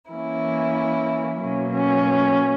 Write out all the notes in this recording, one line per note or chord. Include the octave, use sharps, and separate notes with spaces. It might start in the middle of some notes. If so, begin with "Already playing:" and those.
E3 A#3 C#4 E4
B2 F#3 A#3 C#4
C#4